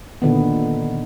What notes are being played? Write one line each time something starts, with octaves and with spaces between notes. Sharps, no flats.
A#2 D3 D#3 B3